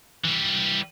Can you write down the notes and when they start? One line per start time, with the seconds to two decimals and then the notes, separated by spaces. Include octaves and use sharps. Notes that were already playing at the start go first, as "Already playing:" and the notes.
0.24 E3 G3